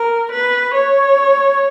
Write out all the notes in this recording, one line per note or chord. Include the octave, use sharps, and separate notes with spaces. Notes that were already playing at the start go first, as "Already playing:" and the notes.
Already playing: A#4
B4
C#5